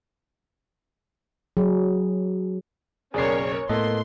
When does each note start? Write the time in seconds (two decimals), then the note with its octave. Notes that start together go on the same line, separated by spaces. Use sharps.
1.57 F#3 G#4
3.14 F#1 B1 C#4 G#4 A#4 C#5 D5 C7
3.69 A2 A#3 B3 A4 D#5 C6